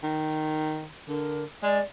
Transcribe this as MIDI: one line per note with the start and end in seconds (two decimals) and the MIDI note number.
0.03 0.87 51
1.08 1.45 50
1.08 1.43 70
1.63 1.80 56
1.63 1.80 74